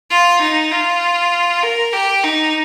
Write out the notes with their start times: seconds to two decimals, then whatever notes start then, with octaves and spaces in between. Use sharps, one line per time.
0.10 F4
0.41 D#4
0.72 F4
1.63 A#4
1.93 G4
2.24 D#4